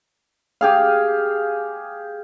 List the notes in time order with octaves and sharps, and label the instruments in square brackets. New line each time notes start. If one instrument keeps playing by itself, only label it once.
[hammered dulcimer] G4 G#4 F5